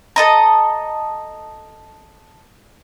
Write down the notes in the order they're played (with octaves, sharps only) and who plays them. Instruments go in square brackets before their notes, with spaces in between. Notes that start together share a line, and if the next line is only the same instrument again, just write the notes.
[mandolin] A4 D#5 A#5